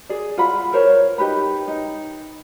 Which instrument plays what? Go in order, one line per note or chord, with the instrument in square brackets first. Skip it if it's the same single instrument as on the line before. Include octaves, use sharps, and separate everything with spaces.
[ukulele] G#4 D5
F4 F#5 B5
A#4 C5 C#5
D#4 G4 B4 B5
D#4